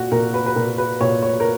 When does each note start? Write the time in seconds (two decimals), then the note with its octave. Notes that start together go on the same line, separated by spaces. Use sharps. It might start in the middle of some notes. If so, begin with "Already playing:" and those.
Already playing: A#2 F#4
0.12 A#2 A#4
0.34 B4
0.46 B4
0.56 A#2 A#4
0.78 B4
1.01 A#2 C#5
1.22 C#5
1.40 A#4